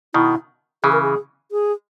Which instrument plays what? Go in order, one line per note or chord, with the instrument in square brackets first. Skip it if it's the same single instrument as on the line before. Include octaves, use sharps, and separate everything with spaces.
[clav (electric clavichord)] B2 D#3 [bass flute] E4
[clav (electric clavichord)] C#3 E3 [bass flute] G#4
[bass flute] A#4
G#4
G#4